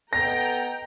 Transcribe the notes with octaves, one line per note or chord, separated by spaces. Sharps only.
B3 A4 D#5 G5 A#5 A#6